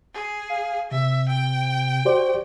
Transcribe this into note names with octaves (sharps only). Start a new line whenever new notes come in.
G#4
F5
C3 E5
G5
F#4 G4 C5 D5